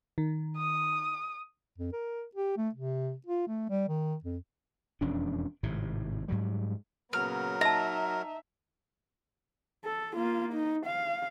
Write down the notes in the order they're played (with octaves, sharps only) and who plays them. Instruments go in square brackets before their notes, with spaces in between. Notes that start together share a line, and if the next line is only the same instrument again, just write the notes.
[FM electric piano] D#3
[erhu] D#6
[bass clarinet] F2
A#4
G4
A3
C3
F4
A3
G3
D#3
F2
[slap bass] E1 F2 C#4 D4
G#1 A2 C3
G#2 F#3 G3
[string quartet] A#2 C#3 B3 [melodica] F#3 A#4 [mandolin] F6
[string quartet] D#4 E5 [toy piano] D#5 A5 [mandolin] A#5
[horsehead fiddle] A4
A#3 F4
D#4
F5